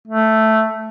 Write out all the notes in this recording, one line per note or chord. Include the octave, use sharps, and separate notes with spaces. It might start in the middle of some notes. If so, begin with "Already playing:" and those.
A3